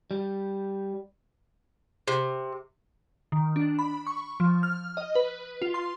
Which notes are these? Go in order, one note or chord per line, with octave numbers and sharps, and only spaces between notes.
G3
C3
D#3
D4
B5
C#6
F3
F6
D#5
B4
F4
C6